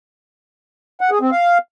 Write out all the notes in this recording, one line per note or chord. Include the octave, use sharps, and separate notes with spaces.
F#5
G#4
C4
F5